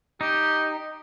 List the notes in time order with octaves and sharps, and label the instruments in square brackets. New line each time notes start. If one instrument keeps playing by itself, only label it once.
[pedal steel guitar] D#4 [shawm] G4